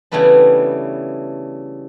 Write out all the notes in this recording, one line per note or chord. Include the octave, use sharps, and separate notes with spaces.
C#3 E3 G3 A3 B3 D4